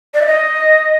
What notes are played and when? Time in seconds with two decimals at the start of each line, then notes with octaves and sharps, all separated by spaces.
0.14 D5
0.22 E5
0.26 D#5